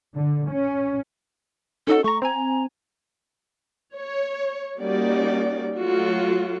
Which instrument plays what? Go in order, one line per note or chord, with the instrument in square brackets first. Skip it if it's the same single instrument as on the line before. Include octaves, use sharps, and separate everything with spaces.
[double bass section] D3
C#4
[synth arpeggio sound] C#4 D#4 F#4 [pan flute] A4
[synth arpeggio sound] A3 A#5 [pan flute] C#6
[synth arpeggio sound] C4 G#5 [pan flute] A#5
[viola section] C#5
G3 A#3 C#4 D#4 F#4 D5
F#3 A3 F4 F#4